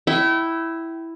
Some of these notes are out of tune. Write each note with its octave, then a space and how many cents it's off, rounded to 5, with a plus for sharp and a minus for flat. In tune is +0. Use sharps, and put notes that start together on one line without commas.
E4 +0 G5 -35